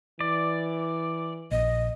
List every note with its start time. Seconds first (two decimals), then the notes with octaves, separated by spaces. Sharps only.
0.21 E3 D5
1.51 A#1 D#5